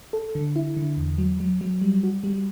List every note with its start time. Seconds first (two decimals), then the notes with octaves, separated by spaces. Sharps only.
0.13 A4
0.35 D3
0.56 E4
0.77 D3
0.97 E2
1.18 F#3
1.40 F#3
1.61 F#3
1.82 G3
2.03 F#4
2.24 G3